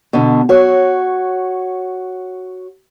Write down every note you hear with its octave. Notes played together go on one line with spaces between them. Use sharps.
B2 D3
F#4 C#5